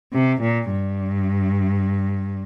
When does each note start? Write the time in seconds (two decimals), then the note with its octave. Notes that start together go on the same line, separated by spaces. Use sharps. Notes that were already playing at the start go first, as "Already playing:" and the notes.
0.13 C3
0.41 A#2
0.70 G2